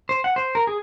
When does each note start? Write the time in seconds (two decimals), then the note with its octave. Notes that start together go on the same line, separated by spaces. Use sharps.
0.09 C5
0.24 F#5
0.36 C5
0.55 A#4
0.67 G#4